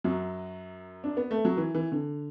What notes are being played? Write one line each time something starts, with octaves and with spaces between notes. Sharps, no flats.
F#2 F#3
D4
B3
A3
F#3
E3
E3
D3